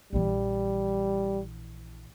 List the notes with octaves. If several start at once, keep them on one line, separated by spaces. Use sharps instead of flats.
A#1 E3 G3